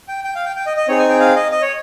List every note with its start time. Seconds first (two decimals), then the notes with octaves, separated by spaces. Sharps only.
0.08 G5
0.24 G5
0.35 F5
0.45 G5
0.56 G5
0.66 D#5
0.77 D#5
0.88 C4 D#4 G#4 C#5
0.99 G#5
1.09 G5
1.20 F5
1.36 D#5
1.52 D#5
1.62 C#5